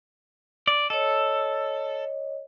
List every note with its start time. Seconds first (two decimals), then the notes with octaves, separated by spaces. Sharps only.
0.68 D5
0.90 A4 C#5 D#5